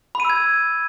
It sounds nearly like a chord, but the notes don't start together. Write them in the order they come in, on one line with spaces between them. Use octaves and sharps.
B5 D#7 E6 G#6